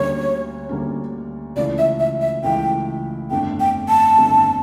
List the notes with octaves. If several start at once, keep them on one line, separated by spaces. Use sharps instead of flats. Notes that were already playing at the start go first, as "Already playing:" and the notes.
Already playing: D2 D3 G3 A#3 C#4 C#5
D2 D3 G3 A#3 C#4
C#2 C#3 E3 A3 E4 D5
E5
E5
E5
C#2 C#3 E3 A3 E4 G5
G1 F2 D3 A3 D4 G5
G5
A5
G1 F2 D3 A3 D4